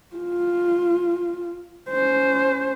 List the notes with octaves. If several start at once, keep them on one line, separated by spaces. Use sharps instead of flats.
F4
C#4 C5